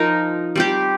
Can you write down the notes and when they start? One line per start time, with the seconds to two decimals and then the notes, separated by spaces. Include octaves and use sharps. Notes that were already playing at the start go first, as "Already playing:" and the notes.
Already playing: F3 D#4 A#4
0.56 G3 C4 G4